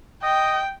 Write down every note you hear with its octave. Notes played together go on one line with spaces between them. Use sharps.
D#5 G5